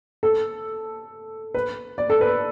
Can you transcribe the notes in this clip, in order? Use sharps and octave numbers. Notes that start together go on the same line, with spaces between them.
A4
B4
D5
A4
B4